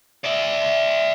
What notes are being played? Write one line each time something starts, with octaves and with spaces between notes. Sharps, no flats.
D5 E5